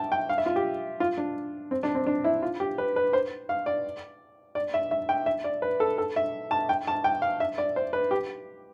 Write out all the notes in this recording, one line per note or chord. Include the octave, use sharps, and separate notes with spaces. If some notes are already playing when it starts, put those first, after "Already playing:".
Already playing: E5 G5 A5
G5
F5
E5
F4
G4
F4
D4
C4
D4
C4
D4
E4
F4
G4
B4
B4
C5
F5
D5
D5
E5
E5
G5
E5
D5
B4
A4
A4
E5
A5
G5
A5
G5
F5
E5
D5
C5
B4
G4